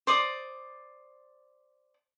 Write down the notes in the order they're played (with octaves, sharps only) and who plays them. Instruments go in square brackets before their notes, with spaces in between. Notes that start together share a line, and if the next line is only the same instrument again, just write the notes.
[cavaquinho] C5 D5 D#6